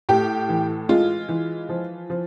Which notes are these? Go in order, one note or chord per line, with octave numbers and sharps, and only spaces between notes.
A2 G4
E3
G#3 F4
E3
F3
F3